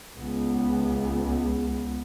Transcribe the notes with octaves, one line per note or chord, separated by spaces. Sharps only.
C#2 B3